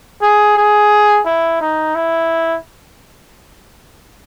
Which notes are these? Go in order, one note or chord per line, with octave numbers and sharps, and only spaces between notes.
G#4
G#4
E4
D#4
E4